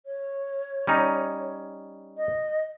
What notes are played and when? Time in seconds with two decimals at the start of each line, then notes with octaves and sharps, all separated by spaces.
0.06 C#5
0.87 G3 C#4 D#4
2.17 D#5